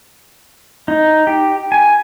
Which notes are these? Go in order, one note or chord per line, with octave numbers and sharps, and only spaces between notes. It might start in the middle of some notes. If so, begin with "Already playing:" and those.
D#4
G4
G#5